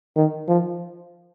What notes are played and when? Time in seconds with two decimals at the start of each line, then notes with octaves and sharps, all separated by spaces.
0.16 D#3
0.48 F3